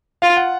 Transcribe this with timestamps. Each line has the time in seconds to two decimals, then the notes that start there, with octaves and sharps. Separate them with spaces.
0.22 F4 F5
0.37 F#5